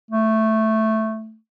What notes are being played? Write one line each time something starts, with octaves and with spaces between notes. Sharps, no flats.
A3